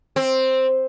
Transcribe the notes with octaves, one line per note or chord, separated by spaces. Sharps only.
C4